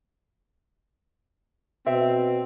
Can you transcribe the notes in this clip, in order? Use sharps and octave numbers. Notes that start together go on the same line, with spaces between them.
B2 C4 E5